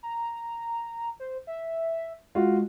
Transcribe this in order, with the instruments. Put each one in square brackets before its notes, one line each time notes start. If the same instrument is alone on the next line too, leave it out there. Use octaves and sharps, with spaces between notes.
[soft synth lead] A#5
C5
E5
[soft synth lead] G#3 [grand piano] F4 F#4